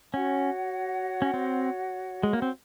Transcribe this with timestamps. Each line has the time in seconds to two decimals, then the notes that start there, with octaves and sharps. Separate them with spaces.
0.14 C#4 F#4 C#5 F#5
1.22 C#4
1.34 C4
2.23 G#3
2.33 A#3
2.42 C4